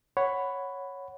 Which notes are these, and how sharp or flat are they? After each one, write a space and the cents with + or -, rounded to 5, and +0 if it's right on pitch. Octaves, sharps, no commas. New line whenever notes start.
C#5 +0 F#5 +0 B5 +10